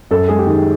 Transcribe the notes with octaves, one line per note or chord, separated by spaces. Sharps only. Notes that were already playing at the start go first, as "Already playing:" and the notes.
F#2 A4
G#3 G#4
G4
D#3